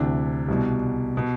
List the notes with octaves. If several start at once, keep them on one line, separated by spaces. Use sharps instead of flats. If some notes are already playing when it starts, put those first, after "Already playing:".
Already playing: D2 C3 E3 D4
C2 B2
B2